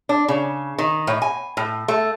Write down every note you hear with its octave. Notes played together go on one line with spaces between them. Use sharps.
D4
C#3
D#3
A2
G#5
A2
A3